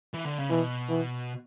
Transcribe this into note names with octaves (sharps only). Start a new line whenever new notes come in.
E3
D3
C#3
B2 E3
E3